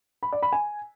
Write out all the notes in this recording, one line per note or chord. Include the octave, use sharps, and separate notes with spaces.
B5
D5
B5
G#5